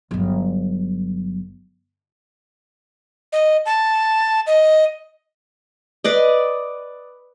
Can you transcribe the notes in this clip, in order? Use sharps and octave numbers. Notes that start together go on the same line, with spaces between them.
G1 F#3
D#5
A5
D#5
B4 D5 D#5